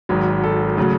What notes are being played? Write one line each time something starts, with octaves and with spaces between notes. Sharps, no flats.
G#1 G#2 F#3
A4
C#3 F#3 A3